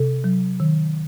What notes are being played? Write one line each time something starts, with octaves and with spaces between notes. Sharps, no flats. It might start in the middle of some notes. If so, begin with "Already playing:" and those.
Already playing: C3 A4
F#3
D#3